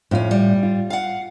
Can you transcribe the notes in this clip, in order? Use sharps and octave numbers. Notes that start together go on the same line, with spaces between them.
F2 A2 C#4 F4
G3
F4
F5 F#5